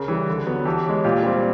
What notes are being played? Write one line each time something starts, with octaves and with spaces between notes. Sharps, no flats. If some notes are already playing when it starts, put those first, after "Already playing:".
Already playing: C#3 G#4 A#4
E3 G3
D3
F#3 B3
E3 G4 A4
G#3 C#4
A#2 F4 G4
G3 C4